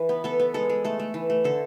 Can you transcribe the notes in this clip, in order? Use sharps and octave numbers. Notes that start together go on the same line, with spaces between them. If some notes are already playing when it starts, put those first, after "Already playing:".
Already playing: E3 B4
B3
B3 A4
B3
G#3 A4
G#3
A3 A4
A3
E3
A3
D3 A4